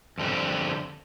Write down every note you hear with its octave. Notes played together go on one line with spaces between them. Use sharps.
F2 D3 G3 C4 G4